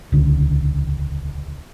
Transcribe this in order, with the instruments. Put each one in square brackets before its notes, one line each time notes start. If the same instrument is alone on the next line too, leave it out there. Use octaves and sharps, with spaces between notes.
[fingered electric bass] D#1 C#2 D3